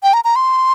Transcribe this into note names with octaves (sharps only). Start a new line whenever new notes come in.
G5
A#5
A#5
C6